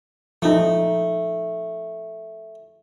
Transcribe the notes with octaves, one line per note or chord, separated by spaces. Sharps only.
F3 A3 D#4